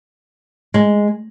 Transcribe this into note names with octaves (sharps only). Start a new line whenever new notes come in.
G#3